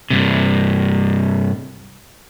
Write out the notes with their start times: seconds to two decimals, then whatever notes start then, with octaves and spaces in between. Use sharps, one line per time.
0.10 G2 C3